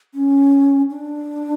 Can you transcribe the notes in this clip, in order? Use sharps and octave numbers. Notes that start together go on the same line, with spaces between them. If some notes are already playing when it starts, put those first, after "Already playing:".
C#4
D4